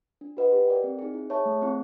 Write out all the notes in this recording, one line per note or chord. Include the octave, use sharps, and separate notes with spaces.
D4
F#4 B4 D#5 F#5
G4
A#4 D5 G5
C4
D#4 G#4
E4
G#4 C#5 E5 A5
A3
C4 E4